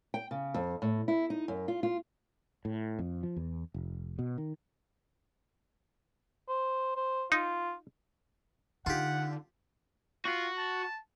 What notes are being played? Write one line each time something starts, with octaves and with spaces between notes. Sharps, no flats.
G5
C#3
F2
A2
E4
D#4
F#2
F4
F4
A2
F2
F3
E2
F1
B2
D#3
C5
C5
D#4 F4
D3 D#4 F4 G4 F#5
F4 F#4
A5